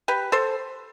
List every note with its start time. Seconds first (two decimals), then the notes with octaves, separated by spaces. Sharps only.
0.08 G4 B4
0.32 A4 C5